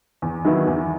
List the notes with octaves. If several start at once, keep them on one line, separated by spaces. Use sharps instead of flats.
E2
D#3 F#3 B3 E4
E2